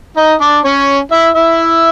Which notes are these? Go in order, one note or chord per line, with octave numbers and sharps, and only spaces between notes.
D#4 D#5
D4 D5
C#4 C#5
E4 E5
E4 E5